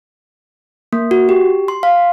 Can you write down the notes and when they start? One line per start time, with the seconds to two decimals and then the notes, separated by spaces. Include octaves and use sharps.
0.93 A#3
1.11 F#4
1.29 G4
1.68 C6
1.83 F5